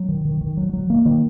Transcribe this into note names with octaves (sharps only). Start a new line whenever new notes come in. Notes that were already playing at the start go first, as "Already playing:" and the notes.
Already playing: F#3
D#3
D#3
D#3
F#3
F#3
A#3
D#3